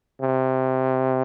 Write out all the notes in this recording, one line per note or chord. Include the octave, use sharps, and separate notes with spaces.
C3